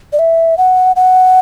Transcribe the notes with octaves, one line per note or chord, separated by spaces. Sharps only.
D5
E5
F#5
F#5